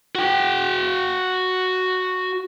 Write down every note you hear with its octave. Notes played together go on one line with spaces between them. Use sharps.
F#4 G5